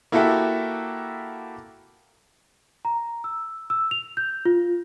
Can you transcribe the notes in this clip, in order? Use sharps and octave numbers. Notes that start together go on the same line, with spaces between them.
A#3 E4 F#4 G4 A4 E5
A#5
E6
E6
F7
G6
F4